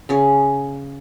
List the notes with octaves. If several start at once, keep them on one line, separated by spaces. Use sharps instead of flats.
C#3 C#4 G#4